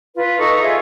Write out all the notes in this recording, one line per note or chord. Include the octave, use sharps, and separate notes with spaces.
F4 B4
D#4 A4 C#6
F4 G#4 C#5 E5